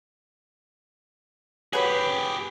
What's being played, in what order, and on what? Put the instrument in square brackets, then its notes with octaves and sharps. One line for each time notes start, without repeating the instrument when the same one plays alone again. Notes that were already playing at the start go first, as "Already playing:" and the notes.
[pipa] F#3 B4 [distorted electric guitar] G4 G#4